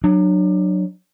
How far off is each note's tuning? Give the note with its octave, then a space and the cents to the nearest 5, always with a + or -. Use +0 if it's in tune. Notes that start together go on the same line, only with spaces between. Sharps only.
F#3 +0 D4 +30